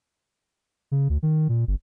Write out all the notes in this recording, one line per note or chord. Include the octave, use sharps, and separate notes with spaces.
C#3
D2
D#3
A#2
G1